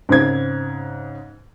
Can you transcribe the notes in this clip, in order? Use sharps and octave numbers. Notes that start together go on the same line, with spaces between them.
G#2 C#3 C4 G#6